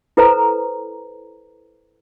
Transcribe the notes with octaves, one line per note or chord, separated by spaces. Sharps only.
E4 A4 B4 C5 A#5